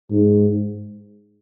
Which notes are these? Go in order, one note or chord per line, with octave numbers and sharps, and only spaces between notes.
G#2